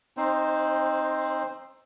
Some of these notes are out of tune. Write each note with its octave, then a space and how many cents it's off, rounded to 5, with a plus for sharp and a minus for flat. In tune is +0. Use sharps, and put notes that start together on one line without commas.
C4 +25 D#4 +0 C5 -5